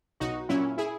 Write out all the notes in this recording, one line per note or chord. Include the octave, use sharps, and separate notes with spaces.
B1 D#4 F#4
A#2 F#3 C#4 E4
E4 G#4